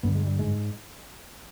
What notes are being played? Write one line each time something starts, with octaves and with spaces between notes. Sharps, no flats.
G2 D3 B3
G#3
G3
G#2 G#3